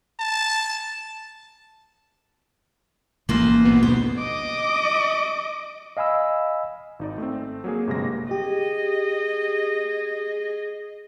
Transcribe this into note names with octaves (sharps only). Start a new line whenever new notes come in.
A5
A1 G#2 A#3 B4 C5
B2 B3
D2 C5
D#5 D6
D#5 F5 G#5 B5 E6
G#1 D#4 D5
A3 C4
F#3 A#3 G#4
G1 C3 G#3 A#3 A#6
G4 G#4 D#5